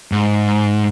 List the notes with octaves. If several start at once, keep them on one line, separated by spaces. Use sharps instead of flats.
G#2